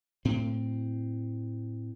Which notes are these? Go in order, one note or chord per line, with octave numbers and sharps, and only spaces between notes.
A2 C4